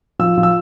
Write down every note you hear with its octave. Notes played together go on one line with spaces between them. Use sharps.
F3 E6
F3
E6